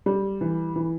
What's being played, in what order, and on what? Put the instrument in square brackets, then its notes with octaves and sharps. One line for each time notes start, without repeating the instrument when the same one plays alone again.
[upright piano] G3
E3
E3